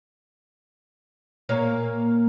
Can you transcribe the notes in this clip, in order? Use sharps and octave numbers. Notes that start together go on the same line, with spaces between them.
A#2 A#3 C#5